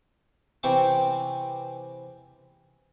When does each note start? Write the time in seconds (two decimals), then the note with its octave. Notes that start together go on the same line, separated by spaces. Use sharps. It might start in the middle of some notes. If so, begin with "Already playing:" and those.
0.63 C3 E3 C4 C5 C#6 D6